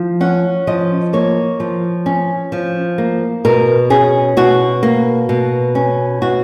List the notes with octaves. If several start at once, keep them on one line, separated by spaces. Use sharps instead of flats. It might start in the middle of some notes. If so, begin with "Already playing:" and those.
Already playing: F3
C#4 F#5
F3 D#5
A#3 C#5
F3
C#4
F3
A#3
B2 A#4
C#4 G#4
B2 F#4
A#3
B2
C#4
B2 F#4